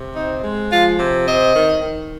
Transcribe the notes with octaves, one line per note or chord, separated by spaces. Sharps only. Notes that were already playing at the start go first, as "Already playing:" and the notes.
Already playing: C3
C4 D#4
G#3
F3 F4
C3
C4 D#5
D#3
D#3